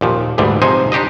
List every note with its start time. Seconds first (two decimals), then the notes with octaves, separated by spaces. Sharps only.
0.01 D#2 A#2 F3
0.38 D2 G#2 D3 E3 G3
0.62 C3 F3 G#3 D#4 C5 G#5
0.92 D4 D#4 G4 C5 D#5